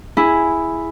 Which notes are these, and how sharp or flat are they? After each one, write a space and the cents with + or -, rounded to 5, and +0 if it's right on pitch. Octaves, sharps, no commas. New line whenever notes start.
E4 +0 G#4 +0